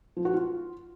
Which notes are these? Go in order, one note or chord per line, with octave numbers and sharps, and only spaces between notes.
F3
F#4
F4